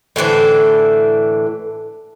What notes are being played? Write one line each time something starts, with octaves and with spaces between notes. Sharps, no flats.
A2 D3 E3 C5